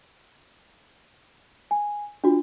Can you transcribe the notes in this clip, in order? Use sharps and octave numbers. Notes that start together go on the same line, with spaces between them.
G#5
D4 F4 F#4